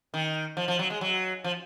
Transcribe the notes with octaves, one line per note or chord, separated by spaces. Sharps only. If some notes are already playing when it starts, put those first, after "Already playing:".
D#3
F3
F3
F#3
G#3
F#3
F3